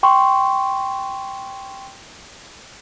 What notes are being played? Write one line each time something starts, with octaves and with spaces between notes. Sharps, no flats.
G5 C6 C#6